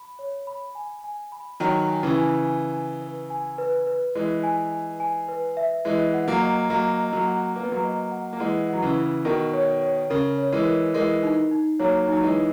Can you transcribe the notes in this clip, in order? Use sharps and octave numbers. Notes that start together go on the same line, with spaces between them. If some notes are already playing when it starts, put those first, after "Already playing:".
Already playing: B5
C#5
B5
G#5
G#5
B5
D#3 F#3 C#5
G#5
C#3 E3
G#5
G#5
G#5
B4
G#5
B4
B4
E3 G#3 B4
G#5
G#5
G#5
B4
E5
E3 G#3 D#5
F#5
F#3 A#3
D#5
F#3 A#3 D#5
D#5
F#3 A#3
F#5
A#3 B4
B3
F#3 A#3
D#5
F#5
A#3
E3 G#3 F#5
F#3 F#5
C#3 E3
B4
B2 D#3 A#4
C#5
C#5
C#3 A#4
C#5
E3 G#3
A#4
E3 G#3 A#4
D#4
D#4
F#3 A#3 C#5
F#3 D#4
E3 G#3
D#4